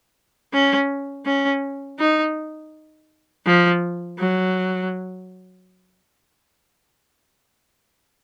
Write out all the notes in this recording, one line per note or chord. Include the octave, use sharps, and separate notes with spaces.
C#4
C#4
D#4
F3
F#3